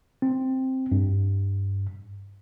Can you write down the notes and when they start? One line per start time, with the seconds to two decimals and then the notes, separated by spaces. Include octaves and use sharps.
0.22 C4
0.92 G2